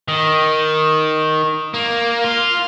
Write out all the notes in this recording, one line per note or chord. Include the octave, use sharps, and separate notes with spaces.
D#3
A#3
F4